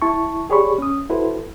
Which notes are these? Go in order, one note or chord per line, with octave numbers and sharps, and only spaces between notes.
E4 A5 C#6
G4 G#4 C#5 D5 B5 C#6
C#4 D#6
E4 F#4 A4 B4 C5